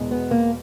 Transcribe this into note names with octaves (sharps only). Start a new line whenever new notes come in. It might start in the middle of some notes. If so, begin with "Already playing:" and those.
Already playing: E1 E2 B2 G#3
B3
A#3